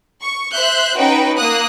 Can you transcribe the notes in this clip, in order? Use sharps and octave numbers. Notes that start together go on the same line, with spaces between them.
C#6
C5 E5 F#6 G6
C#4 D#4 F#4 B4 G5
A#3 D#6 F#6